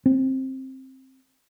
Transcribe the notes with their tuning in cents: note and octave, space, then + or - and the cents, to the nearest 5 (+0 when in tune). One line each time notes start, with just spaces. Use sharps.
C4 +15